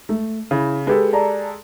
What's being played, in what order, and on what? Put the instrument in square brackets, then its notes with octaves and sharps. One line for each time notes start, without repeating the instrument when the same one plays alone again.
[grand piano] A3
[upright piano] C#3 [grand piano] E4
[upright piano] G#3 G4 A4 [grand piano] B4
[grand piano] D5 A5 A#5